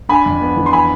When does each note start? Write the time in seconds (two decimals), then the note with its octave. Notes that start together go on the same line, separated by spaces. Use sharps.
0.09 D4 G#5 B5
0.26 F2
0.41 B3
0.57 E3
0.66 C6
0.73 G#5 B5